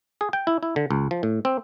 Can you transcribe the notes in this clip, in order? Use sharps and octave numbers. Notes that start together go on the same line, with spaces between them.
G#4
G5
E4
E4
D3
C#2
F3
A2
C4